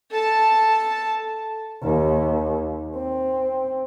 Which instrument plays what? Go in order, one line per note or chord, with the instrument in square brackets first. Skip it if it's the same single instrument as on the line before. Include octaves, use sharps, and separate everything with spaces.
[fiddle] A4 A5
[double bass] D#2
C4